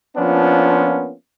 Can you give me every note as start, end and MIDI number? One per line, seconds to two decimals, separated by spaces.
0.16 1.11 53
0.16 1.11 58
0.16 1.11 59
0.16 1.11 61
0.16 1.11 62
0.16 1.11 65